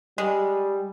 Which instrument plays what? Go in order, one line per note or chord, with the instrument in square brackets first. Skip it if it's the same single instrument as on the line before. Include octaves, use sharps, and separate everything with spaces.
[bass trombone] G3 [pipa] G#3